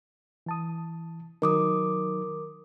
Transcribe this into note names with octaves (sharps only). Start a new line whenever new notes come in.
E3 A5 D#6
D#3 F#3 D#4 A#4 D6 D#6